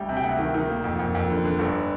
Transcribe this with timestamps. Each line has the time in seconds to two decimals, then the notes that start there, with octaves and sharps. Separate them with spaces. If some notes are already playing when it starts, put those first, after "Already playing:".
Already playing: D2 G3 G5
0.09 C3
0.17 G5
0.24 D2 F#5
0.39 D#3
0.54 D#3
0.70 A#3
0.84 F2
0.99 F2
1.15 F2
1.30 D3
1.45 D3
1.59 G1